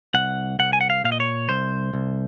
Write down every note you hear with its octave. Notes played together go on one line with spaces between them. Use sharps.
C2 F#5
C2 F#5
G#5
F#5
F5
A#2 F5
D#5
C#5
C2 C5
C2